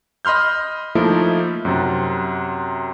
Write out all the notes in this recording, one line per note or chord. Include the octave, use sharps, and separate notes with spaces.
D#5 B5 C6 F6 G6
F3 A3 A#3 D#4 E4
F#2 C3